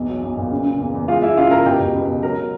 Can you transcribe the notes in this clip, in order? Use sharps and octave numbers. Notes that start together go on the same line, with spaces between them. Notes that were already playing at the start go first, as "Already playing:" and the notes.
Already playing: B1 E2
F#3
B1
A#2
C#3
C#3
E2
E2
G#3 F4 F5
G#3 E4 E5
C#3 F4 F5
C#2 A#4 A#5
B2 G4 G5
B2
C#2
B2
F#3 A#4 A#5